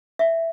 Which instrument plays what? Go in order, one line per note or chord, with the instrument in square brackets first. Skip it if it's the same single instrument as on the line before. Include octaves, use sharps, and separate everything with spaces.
[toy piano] E5